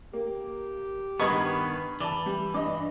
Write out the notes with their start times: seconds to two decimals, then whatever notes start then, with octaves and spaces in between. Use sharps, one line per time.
0.13 A#3 G4
1.20 G2 D#3 B3 B4 D#5 B5 C#6 G#6
2.00 E3 D5 A5
2.26 G3
2.54 G2 D#5 D6